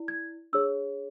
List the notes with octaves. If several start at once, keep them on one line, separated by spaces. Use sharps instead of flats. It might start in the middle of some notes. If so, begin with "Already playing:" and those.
Already playing: E4 D5
G#6
D4 G#4 C#5 E6